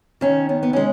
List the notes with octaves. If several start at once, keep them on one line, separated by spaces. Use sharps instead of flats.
D#3 C#4
B3
B3
G#3 C#4